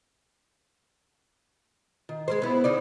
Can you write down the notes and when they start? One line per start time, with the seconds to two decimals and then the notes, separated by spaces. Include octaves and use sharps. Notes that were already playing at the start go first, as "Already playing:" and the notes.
2.09 D#3
2.28 G#3 A#3 C5
2.42 B3 E4
2.64 C#3 D#4 D5